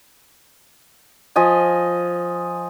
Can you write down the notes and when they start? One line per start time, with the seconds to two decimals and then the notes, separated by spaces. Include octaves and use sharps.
1.36 F3 D#5 G#5